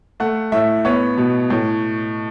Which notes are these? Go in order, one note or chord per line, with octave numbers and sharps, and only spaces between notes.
A3 F#5
A2 E5
B3 C#5
B2
A2